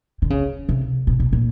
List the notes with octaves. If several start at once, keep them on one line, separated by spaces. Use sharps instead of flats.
D3
C#3
C3
B2
A#2
A#2